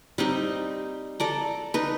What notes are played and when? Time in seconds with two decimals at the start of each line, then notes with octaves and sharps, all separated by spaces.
0.18 G3 C4 D#4
1.20 A4 D5 A#5
1.74 D#4 B4